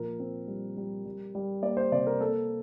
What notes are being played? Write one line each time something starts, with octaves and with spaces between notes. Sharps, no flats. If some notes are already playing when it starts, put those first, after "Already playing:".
Already playing: A#2 F3 A#4
C4
G3
G3
G3
G3
A#3 D5
C5
C3 D5
A#4
A#3 A4